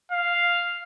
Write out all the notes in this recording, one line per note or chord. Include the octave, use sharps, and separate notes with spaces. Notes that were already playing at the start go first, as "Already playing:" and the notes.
F5